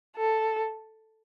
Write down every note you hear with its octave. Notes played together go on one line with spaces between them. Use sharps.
A4